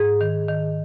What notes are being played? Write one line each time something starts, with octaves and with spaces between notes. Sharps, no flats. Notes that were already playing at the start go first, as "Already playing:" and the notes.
Already playing: G#2 G#4
D#3
D#3